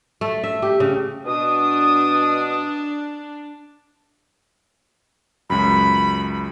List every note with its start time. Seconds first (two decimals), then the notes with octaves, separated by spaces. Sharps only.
0.21 A3
0.44 E5
0.62 G4
0.80 C#3
1.25 B2 D4 D#6
5.50 C#2 F#2 B5